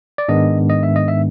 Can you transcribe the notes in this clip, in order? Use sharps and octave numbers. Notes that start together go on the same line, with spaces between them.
D5
G#2 D#3 G#3 B3 D4 D#5
D#5
E5
D#5
E5